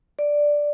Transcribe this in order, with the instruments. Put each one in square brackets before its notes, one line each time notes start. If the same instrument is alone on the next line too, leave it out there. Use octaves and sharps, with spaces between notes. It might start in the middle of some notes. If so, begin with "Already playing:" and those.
[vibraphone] D5